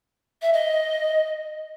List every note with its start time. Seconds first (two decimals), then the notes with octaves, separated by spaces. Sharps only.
0.42 E5
0.53 D#5